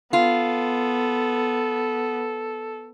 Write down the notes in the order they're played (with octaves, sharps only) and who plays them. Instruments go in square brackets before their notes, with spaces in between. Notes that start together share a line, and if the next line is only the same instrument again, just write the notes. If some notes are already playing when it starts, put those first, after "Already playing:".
[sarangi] B3 [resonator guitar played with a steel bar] F4 [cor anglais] A4